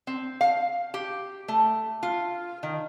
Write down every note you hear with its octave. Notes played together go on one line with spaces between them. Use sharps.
C4
F5
G4
A3
F4
D#3